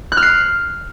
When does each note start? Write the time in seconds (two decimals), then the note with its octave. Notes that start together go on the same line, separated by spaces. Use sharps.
0.12 F#6
0.17 F6
0.23 C7